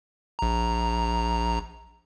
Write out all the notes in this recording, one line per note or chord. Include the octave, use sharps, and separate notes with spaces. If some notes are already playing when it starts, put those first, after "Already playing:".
A#1 A#5